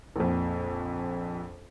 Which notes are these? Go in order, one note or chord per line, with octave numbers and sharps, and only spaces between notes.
A#1 F2